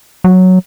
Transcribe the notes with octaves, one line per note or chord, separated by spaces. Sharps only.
F#3